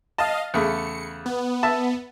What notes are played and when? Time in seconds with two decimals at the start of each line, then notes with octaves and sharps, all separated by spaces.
0.18 D#5 F5 A5 F6
0.54 E2 C#3 A3 C#7
1.26 B3
1.63 E5 A5